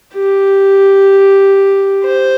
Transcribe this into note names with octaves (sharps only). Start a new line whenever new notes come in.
G4
C5